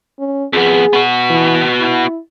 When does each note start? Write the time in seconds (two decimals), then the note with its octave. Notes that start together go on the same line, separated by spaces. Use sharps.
0.19 C#4
0.53 F2 B3 G#4
0.93 B3 F#4
1.30 E3
1.80 E4